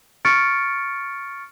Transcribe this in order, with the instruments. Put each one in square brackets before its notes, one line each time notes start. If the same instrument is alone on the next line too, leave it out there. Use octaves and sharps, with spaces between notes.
[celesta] C#6 F6 A6 C#7 D7